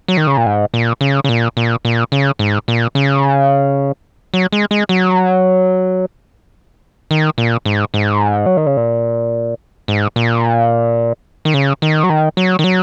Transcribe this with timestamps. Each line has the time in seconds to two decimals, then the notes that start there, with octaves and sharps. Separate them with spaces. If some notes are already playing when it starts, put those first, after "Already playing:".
0.08 F#3
0.17 D#3
0.27 C#3
0.37 A#2
0.46 G#2
0.74 A#2
1.01 C#3
1.24 C#3
1.29 A#2
1.57 A#2
1.85 A#2
2.12 C#3
2.39 G#2
2.68 A#2
2.95 C#3
4.34 F#3
4.52 G#3
4.71 G#3
4.89 F#3
7.11 D#3
7.38 A#2
7.65 G#2
7.94 G#2
8.46 F#3
8.57 D#3
8.67 C#3
8.77 A#2
9.88 G#2
10.16 A#2
11.45 D#3
11.54 C#3
11.82 D#3
12.03 F#3
12.10 D#3
12.37 F#3
12.59 D#3
12.64 F#3